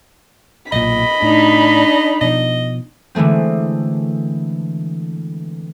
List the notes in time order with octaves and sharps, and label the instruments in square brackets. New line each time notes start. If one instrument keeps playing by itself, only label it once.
[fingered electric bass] B1 A#2 [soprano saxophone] D#5 [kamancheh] B5
[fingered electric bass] A2 [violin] D4 D#4
[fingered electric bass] B2 F3 [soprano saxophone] D#5
[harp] D3 E3 G#3 A3 C4